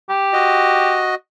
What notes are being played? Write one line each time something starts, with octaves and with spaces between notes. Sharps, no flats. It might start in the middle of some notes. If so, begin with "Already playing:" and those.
G4
F#4 D#5